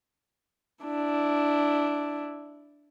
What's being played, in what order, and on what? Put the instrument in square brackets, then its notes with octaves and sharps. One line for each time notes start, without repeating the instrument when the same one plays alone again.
[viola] D4 E4